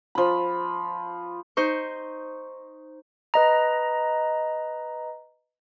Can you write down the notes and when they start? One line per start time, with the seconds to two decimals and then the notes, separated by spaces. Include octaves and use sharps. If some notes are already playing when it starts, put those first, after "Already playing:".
0.15 F3 B5
1.57 D#4 C5 C#6
3.34 B4 D#5 A#5